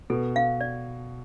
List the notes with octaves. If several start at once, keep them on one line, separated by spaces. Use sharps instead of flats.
B2 A4
F5
D5